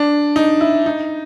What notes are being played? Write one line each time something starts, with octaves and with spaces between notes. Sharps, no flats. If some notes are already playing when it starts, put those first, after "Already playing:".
Already playing: D4
D#4
E4
D#4